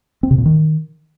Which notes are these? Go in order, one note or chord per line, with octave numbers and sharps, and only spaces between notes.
C4
C3
A#2
D#3